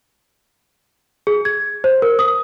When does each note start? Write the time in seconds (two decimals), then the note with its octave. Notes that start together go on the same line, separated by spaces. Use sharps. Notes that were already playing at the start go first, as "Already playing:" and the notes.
1.27 G#4
1.45 G#6
1.84 C5
2.02 A#4
2.19 D#6